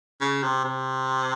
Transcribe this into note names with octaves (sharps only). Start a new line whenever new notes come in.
C#3
C3
C3